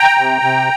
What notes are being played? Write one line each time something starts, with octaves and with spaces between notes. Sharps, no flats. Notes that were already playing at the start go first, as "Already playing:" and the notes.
Already playing: G5 A#5
C3
C3